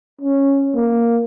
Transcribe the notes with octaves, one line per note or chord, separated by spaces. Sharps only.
C#4
A#3